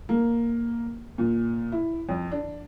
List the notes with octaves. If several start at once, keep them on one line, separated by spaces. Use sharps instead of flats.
A#3
A#2
E4
F2
D4